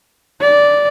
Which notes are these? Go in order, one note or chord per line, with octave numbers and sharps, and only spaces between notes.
D5